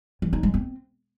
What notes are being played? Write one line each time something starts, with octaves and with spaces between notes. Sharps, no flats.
E3
D#4
G#3
C4